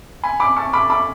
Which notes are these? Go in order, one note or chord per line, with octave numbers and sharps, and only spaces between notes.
G#5 B5
B5 D6
A5 C#6
B5 D6
B5 D6